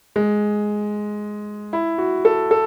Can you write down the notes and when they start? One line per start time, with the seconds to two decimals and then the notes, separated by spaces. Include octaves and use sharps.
0.16 G#3
1.73 E4
1.98 F#4
2.25 A4
2.51 A4